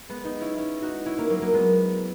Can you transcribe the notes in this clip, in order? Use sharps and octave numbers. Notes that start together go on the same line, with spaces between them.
G#3 B3
B3 D#4
C#4 E4
C#4 E4
D#4 F#4
C#4 E4
A#3 C#4
F#3 A#3
F#3 A#3
G#3 B3